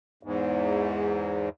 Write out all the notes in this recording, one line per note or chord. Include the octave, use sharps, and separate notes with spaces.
E2 G#2